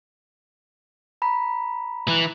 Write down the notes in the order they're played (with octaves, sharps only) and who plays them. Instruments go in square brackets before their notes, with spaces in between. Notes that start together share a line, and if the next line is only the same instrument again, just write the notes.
[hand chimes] A#5 B5
[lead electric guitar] E3